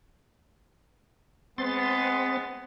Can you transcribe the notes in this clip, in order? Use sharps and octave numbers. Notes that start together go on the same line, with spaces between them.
G#3 B3 C4 C6 A6